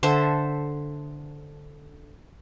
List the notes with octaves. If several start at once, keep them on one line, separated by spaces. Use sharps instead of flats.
D3 A4 C5 E5